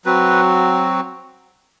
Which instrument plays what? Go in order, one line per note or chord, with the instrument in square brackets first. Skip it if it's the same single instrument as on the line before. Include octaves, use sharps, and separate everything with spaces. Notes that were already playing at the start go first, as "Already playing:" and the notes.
[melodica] F#3 C4 F#4 B4